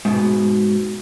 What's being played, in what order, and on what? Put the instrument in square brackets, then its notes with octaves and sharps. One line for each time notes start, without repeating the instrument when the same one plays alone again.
[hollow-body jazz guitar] G#2 B2